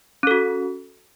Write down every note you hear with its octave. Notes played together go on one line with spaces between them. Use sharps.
C#4 F#4 A4